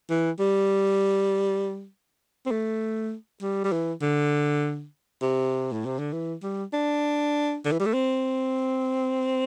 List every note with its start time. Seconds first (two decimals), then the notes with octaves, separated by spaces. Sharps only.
0.10 E3
0.40 G3
2.46 C4
2.51 A3
3.42 G3
3.64 G3
3.72 E3
4.02 D3
5.22 C3
5.72 A2
5.86 C3
5.99 D3
6.13 E3
6.43 G3
6.73 D4
7.65 D3
7.72 E3
7.80 G3
7.86 A3
7.93 C4